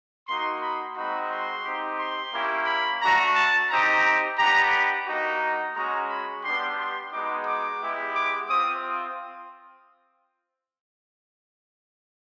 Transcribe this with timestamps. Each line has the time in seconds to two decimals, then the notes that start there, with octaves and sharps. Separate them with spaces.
0.27 A#3 D#4 F#4 C6
0.61 B5
0.95 G#3 C4 D#4 F#4 B5
1.30 C6
1.64 C4 D#4 G4
1.98 C6
2.32 A#3 C#4 E4 G4
2.66 B5
3.01 A3 D4 F#4 A#5
3.35 A5
3.69 C4 D#4 G4 A#5
4.37 B3 D4 G4 A#5
5.06 A#3 D#4 F#4
5.74 G#3 C#4 F#4 A#5
6.08 B5
6.43 G3 B3 D4 G4 C6
6.77 C6
7.12 G#3 B3 D#4 F#4 D6
7.46 D6
7.80 G#3 B3 E4 G4
8.15 D6
8.49 C4 F4 D#6